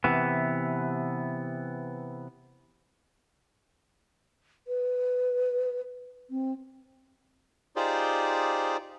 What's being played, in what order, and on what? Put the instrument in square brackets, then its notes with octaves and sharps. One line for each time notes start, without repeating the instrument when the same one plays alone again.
[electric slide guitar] C3 E3 B3
[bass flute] B4
C4
[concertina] D#4 F4 G4 G#4 C5 D5